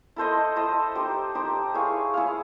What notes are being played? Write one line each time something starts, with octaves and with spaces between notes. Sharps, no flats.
E4 A4 C5 D#5
E4 A4 C5 D#5
D#4 G4 C5
D#4 G4 C5
E4 G#4 C#5 F5
E4 G#4 C#5 F5